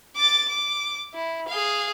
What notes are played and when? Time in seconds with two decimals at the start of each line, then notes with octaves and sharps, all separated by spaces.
0.16 D6 A6
0.49 D6
1.14 E4
1.48 G#4 F5